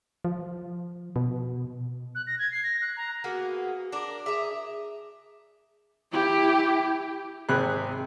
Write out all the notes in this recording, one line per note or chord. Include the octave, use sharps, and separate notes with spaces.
F3
B2
F#6
A#6
G#6
C7
A#6
F#6
A#5
A#3 B3 F#4 G#4
D4 A#4 D6
G#4 E5 A#5
E4 G4
G#1 C3 G#4 B5 F#6